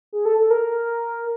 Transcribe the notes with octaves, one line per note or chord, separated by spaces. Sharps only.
G#4
A4
A4
A#4